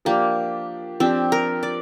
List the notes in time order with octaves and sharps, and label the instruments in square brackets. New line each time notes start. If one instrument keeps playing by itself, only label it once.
[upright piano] F3 D4 G4 [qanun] A#3
[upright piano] F3 D4 G4 [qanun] C4
[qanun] A#4
D5